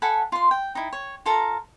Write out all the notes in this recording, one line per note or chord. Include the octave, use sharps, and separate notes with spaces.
A4 F#5 G#5 B5
F4 C6
G5
D#4 E4
C#5
F4 A4 A#4 A#5